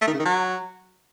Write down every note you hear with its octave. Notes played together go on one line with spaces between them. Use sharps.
A3
D#3
C#3
D#3
F#3